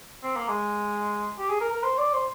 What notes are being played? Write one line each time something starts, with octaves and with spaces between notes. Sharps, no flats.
C4
A#3
G#3
G4
G#4
A#4
A#4
C5
D5
C5